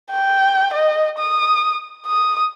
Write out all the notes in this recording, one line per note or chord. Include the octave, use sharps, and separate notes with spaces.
G5
D#5
D#6
D#6